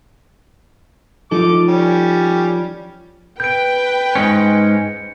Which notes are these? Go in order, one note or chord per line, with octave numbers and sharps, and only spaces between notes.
F3 D#4 A4 D6
G3 C#4
B4 G5 G6 D7
G#2 G#3 C#4 C#7